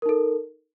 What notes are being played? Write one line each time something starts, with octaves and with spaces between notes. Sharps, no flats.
D#4 A4 A#4